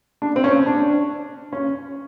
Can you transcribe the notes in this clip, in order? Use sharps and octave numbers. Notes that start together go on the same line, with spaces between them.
D4
C4
C#4
D4
C#4